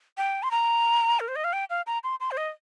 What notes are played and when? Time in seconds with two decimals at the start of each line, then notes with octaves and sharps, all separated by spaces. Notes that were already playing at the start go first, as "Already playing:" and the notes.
0.18 G5
0.43 C6
0.51 A#5
1.20 A#4
1.28 C5
1.36 D#5
1.44 F5
1.53 G5
1.70 F5
1.87 A#5
2.04 C6
2.20 C6
2.31 C5
2.37 D#5